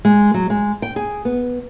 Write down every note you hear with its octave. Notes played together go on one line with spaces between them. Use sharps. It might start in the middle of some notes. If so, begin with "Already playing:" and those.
G#3
F#3
G#3
G5
G#4
B3